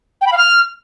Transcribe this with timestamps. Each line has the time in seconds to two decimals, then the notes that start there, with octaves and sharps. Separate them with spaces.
0.21 G5
0.27 B5
0.32 F5
0.37 F6